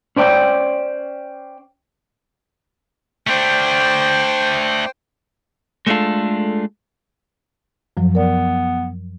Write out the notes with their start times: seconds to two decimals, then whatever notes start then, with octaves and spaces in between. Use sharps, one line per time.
0.16 C#4 C5 D5 F#5 G5
3.27 A3 D4 C5 G5
5.87 G#3 A3 B3 D4 F4 A4
7.97 F#2 F3 F#3
8.15 B3 A#4 D5